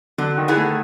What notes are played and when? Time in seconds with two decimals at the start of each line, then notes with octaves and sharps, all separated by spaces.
0.18 D3 F#3
0.38 D#3
0.48 B3 E4 G#4
0.57 A3